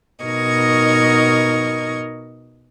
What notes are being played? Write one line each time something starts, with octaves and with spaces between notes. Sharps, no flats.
B2 D#4 A#4 D#5 C#6 G#6